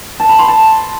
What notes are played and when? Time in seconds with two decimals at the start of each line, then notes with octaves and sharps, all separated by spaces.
0.20 A5
0.29 B5
0.39 C6
0.48 A5